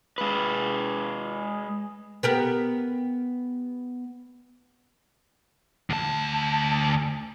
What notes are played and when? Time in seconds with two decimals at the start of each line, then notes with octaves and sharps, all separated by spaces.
0.18 G#3 B4
2.23 B3 G4 A#4
5.90 D2 A5